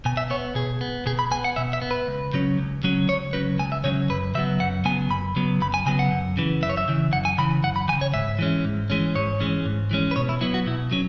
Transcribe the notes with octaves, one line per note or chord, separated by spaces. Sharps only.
B2 G#5
E5
B3 C#5
B2 G#4
B3
B2 G#4
B5
B3 G#5
F#5
B2 E5
E5
B3
B4
C#2
C#3 F#3 C#4
C#2
C#3 F#3 C#4
C#2 C#5
C#3 F#3 C#4 B4
C#2 G#5
E5
C#3 F#3 C#4 C#5
F#2 B4
C#3 F#3 B3 E5
F#2 F#5
C#3 F#3 B3 G#5
F#2 B5
C#3 F#3 B3
F#2 B5
G#5
C#3 F#3 B3 G#5
F#5
F#2
C#3 E3
F#2 E5
C#5
E5
C#3 E3
F#2 F#5
G#5
C#3 E3 B5
F#2 F#5
B5
E3 G#5
C#3
C#5
G#2 E5
E3 G#3 C#4
G#2
E3 G#3 C#4
G#2 C#5
E3 G#3 C#4
G#2
E3 G#3 C#4
B4
B2 C#5
E4
F#3 B3 E4
F#4
B2 E4
F#3 C#4